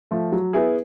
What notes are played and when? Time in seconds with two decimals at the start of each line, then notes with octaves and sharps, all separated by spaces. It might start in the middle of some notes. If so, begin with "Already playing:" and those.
0.11 F3 A3
0.32 F#3
0.53 B3 E4 G#4